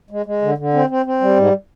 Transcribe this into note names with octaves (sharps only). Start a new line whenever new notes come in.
G#3
G#3
D3
D3
C4
C4
C4
G3
G#2